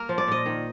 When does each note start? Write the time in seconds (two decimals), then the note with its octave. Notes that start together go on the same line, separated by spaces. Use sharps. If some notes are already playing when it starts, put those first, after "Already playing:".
Already playing: A#3 A#4
0.09 F3
0.18 D5
0.28 A#2 D#5
0.46 D#3